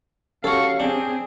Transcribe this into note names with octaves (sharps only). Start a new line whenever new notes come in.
C#4 F#4 G4 A4 C#5 F5 C#6
C4 D4 G#4